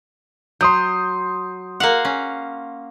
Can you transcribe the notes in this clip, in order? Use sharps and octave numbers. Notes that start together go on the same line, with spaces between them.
F#3 C6 D#6 G6
A#3 F5 F#5
C#4